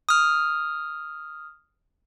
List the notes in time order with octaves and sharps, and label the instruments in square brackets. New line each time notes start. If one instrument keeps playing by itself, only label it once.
[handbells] D#6 F6